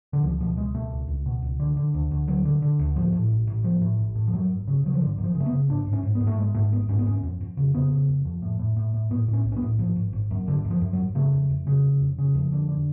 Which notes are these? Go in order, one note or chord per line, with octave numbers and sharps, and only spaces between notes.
D3
C#2 F3
B2 F3
C#2 G#3
B2 A3
C#2
C#2
B2
C#2
D3
D3
D2
D2
D2 F#3
D3
D3
D2
A1 F3
A2
A1
A1
A1 F3
A2
A1
A2
F3
F#2 F#3
G#1
C#3
C#3 F#3
F3
G#1 D3
F#2
F3
C#3
A3
B3
C#3
G#1 D4
G#2
C#4
G#2
B3
G#2
A3
G#1 G#3
G#2 A3
G#1 B3
G#2 C#4
B3
F1 C#4
F2
F2
C#3
C#3 B3
C#3
F1
F2
A2
A2
A2
A2
A2 B3
A2
C#4
B1
C#4
B3
A2
G#1 F3
G#1
G#1
F#2
G#1 D3
F#2
F3
F#2
F#3
G#1
C#3 A3
F1
F1
C#3
F1
F1
C#3
F2
D3
D3